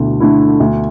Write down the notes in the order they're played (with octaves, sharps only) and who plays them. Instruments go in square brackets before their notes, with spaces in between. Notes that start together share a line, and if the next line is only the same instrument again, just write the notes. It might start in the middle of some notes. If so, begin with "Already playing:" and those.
Already playing: [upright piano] D2 D3 A3 E4 [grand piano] B2
[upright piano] D3 A3 E4
D2